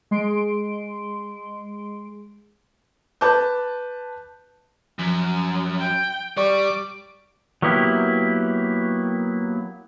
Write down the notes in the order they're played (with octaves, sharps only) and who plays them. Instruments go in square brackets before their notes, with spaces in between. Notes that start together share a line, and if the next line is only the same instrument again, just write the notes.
[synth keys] G#3 C6 D7
[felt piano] B4 A5 D6 G6
[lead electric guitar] F#2 [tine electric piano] F3
[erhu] G5
[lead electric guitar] G3 [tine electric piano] D5 C#6 [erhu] D6
[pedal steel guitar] F#3 A#3 B3 E4 G4